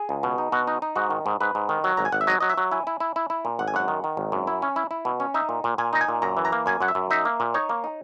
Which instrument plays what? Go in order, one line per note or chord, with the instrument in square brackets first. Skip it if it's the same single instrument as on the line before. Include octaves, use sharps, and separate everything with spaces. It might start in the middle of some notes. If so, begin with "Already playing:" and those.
Already playing: [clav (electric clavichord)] G#4
C#2
B2
D#4
B2 F#4
D#4
D#4
G#2 F#4
D#3
G#2
G#2 B4
G#2
D#3
F#3
G#1 A#5
G#5
G#1 F#5
E5
F#3 D#5
F#3 D#5
E5
F#3
E4 G#5
E4
E4
E4
E4
A#2
G#1 F#5
G#5
F#2 F#5
D#3
D#3
G#1
F#2
E4
C#4
E4
E4
B2
C#4
D#4 E5
A#2
A#2
A#2 G#5
D#4 A#5
G#5
A#2
F#2 A#5
E3
A#5
A#3
F#2 G#5
F#2 F#5
E5
F#2
D#4 E5
A#3
A#2
D#4 C#5
A#3
D#4